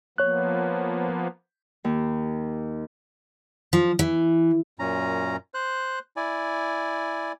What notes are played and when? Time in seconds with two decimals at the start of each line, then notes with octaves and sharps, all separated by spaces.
0.18 F3 A#3 B3 C#5 F#6
1.85 D#2
3.73 F3
3.99 E3
4.79 F#2 A#2 C#4 A#5
5.54 C5 F#6
6.16 E4 D5 G#5